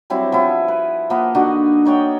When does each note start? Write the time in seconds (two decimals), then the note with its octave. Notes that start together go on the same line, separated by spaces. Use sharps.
0.10 F#3 G3 C4 E4
0.32 F3 B3 E4
0.68 B4
1.10 F3 A#3 B3
1.35 D3 D4 D#4 F#4
1.85 D#4 C#5 D5 G5